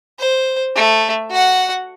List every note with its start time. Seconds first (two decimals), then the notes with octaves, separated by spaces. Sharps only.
0.19 C5
0.76 A3
1.31 F#4 F#5